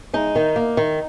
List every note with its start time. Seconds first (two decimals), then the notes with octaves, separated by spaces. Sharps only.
0.13 G#3 D#4
0.35 D#3
0.56 A#3
0.77 D#3